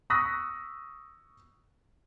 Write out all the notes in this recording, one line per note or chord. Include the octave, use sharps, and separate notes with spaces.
C#6 D#6 E6 F#6 A#6 B6